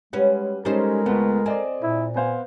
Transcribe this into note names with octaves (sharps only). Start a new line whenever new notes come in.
G3 G#3 C#4 F#4 B4
G3 G#3 C#4 D#4 A4 A#4 C5
C#2 A3 B3
C4 D5 D#5 G#5
A#2 E4
B3 C5 F5 G#5